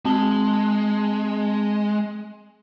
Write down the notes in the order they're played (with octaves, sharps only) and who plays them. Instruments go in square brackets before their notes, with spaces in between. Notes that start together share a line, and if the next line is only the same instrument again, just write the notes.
[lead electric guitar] G#3 [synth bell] C4 A5 G7